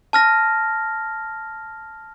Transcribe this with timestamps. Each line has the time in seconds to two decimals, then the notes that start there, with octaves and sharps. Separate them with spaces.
0.13 A5 F6 A#6